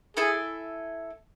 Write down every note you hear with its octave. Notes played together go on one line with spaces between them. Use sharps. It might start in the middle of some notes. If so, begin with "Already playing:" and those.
E4 G#4 A4 E5 G#5